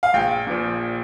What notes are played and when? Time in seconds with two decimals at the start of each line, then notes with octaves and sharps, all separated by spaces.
0.03 F5
0.13 A#1 G5
0.47 A#2 F3